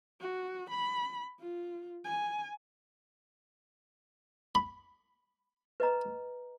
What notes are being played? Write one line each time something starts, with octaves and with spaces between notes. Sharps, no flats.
F#4
B5
F4
G#5
B5
B4 D#5 A#5